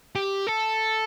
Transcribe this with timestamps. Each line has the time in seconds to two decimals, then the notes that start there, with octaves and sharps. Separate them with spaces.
0.16 G4
0.47 A4